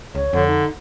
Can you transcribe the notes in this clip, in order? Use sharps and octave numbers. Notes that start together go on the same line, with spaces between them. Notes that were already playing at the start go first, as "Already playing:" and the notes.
C#2 C#5
F2 D3
D#4